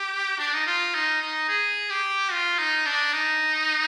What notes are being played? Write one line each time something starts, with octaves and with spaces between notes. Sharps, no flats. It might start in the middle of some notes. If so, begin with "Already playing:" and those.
Already playing: G4
D4
D#4
F4
D#4
D#4
G#4
G4
F4
D#4
D4
D#4